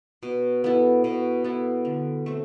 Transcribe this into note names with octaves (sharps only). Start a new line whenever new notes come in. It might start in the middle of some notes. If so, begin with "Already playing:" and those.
B2
B3 E4 A4
B2
B3 E4 A4
D3
A3 C4